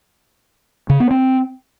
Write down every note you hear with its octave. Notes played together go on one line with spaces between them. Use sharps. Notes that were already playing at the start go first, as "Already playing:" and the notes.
C#3
B3
C4